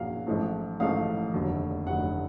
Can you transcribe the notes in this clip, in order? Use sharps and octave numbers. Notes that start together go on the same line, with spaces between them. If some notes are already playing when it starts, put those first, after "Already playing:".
Already playing: A#1 A#2 F#3 A#3 C#4 F5 F#5
A1 G#2 F3 A3
A1 G#2 F3 A3 F5
F1 D#2 D3 F#3
F1 D#2 D3 F#3 F#5